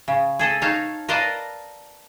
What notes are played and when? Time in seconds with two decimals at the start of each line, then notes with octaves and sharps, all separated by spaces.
0.08 C#3
0.39 G#4 A4 D#5
0.62 D#4 C#5 F5 A5
1.08 A#4 B4 D5 D#5 F5 A5